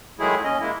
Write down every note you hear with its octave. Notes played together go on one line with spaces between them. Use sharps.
D#3 F#3 G#3 A3 E4 G#4
D#2 C#4 D#5
G#3 A#3 E4